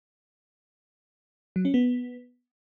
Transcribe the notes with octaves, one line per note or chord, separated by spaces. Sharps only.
F#3
C#4
B3